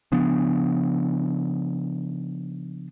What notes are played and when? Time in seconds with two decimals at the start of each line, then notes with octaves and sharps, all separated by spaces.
0.12 C#3 F3 B3 D4